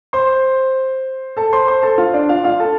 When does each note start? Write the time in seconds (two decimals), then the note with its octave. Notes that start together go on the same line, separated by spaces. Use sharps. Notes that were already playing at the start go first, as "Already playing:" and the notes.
0.13 C5 C6
1.37 A4 A5
1.53 C5 C6
1.68 C5 C6
1.83 A4 A5
1.98 F4 F5
2.14 D4 D5
2.29 F4 F5
2.44 F4 F5
2.60 A4 A5